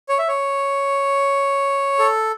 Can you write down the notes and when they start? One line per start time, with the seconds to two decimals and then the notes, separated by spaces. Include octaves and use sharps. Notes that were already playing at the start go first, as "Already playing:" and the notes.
0.09 C#5
0.19 E5
0.28 C#5
1.99 A4